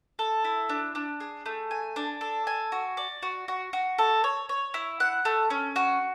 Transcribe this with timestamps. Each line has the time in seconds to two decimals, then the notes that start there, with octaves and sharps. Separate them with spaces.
0.19 A4
0.45 E4
0.69 D4
0.95 D4
1.20 G#4
1.46 A3
1.71 G#5
1.96 D4
2.21 A4
2.47 G#5
2.72 F#4
2.97 D5
3.23 F#4
3.48 F#4
3.73 F#4
3.98 A4
4.24 C#5
4.49 C#5
4.74 E4
5.00 F#5
5.25 A3
5.50 C#4
5.76 F#4